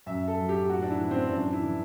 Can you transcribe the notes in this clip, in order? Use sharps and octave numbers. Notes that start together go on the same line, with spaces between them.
F#2 E5
A4
F#3
G4
A2 F#4
D4
E4
E3
C4
F#2 D4
E4
E3